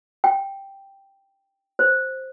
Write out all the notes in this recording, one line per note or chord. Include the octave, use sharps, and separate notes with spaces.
G5
C5